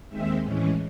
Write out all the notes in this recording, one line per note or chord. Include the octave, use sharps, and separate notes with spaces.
D#2 D#3 G#3 C4 E5
A2 E3 G#3 C#4